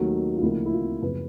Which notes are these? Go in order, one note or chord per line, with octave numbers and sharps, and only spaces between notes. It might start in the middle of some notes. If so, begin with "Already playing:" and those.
Already playing: D#2 D#3 F#3 A3
F4
D2 C#3 F3 A#3 E4
E4
F4
F#1 F#2 C#3 F3 B4